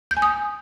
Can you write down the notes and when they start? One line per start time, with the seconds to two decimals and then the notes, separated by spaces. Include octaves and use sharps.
0.11 G6
0.17 G#5
0.22 D#6